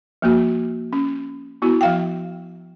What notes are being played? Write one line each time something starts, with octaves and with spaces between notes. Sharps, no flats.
F3 A#3 F#4
C#4
B3 E4 F#4
F3 F5 G5